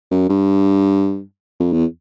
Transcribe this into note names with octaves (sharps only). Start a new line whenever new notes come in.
F#2
G2
F2
E2